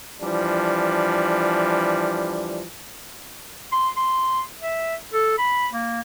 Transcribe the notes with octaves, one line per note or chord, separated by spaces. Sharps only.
E3 F3 G3 D4
C6
C6
E5
A4
B5
A#3